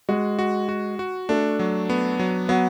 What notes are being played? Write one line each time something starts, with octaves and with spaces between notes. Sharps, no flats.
G#3 F#4
F#4
F#4
F#4
A3 D4
F#3
B3
F#3
F#3 B3